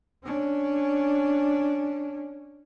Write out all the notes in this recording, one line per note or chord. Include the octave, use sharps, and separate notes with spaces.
C#4 D4